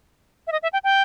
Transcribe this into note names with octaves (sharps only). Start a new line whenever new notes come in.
E5
D#5
E5
G5
G5